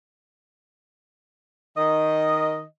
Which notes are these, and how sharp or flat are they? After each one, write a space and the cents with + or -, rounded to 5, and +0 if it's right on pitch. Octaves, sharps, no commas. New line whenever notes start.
D#3 +0 D#5 +0